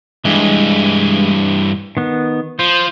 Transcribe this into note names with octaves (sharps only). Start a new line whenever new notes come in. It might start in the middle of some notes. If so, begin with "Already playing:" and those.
G2 E3 G#3
D#3 B3
F3 C5